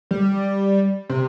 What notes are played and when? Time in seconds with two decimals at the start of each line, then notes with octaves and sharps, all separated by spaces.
0.11 G3
1.09 C3